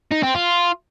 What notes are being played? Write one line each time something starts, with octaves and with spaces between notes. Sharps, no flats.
D#4
C4
F4